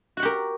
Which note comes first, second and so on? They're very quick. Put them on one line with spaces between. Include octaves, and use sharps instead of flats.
F#4 F#5 G4 A#4